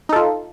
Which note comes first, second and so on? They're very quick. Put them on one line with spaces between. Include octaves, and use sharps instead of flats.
D#4 A4 F4